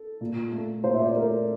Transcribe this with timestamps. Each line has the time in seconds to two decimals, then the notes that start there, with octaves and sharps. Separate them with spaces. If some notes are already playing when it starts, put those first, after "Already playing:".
Already playing: A4
0.21 A#2
0.52 A3
0.84 A#2 C5
0.94 E5
1.02 D5
1.08 C5
1.16 A3 A#4